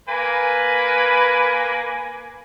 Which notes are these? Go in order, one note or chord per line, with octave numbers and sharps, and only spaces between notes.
A#3 B4 G#5